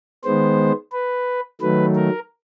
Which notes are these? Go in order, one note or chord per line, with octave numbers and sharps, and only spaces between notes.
D#3 G#3 B3 C5
B4
D#3 F#3 A3 B4
A#4